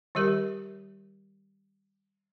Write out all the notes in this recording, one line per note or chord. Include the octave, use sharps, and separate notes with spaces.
D#3 G3 G4 A#4